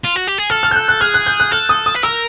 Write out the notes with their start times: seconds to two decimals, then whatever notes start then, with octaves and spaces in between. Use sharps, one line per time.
0.04 F4
0.16 F#4
0.28 G4
0.38 G#4
0.50 A4 F6
0.63 F6
0.71 G6
0.76 F#6
0.88 F#6
1.01 G#4 F6
1.14 F#6
1.26 G6
1.40 F#6
1.52 A4 F6
1.69 D#6
1.86 D#6
1.95 B4
2.03 A#4 E6